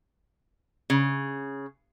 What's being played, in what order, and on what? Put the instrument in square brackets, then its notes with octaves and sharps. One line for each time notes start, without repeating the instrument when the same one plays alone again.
[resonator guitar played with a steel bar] C#3